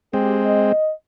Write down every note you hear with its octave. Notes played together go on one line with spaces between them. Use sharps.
G#3 C4 G4
D#5